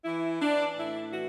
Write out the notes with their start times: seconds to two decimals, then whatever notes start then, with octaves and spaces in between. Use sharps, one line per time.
0.05 E3 E4
0.41 E3 D4
0.76 A2 E4
1.12 E3 F#4